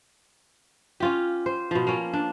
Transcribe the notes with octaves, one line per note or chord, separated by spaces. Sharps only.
C#4 F4 G4
C5
B2 F3
A#3 C#4
D4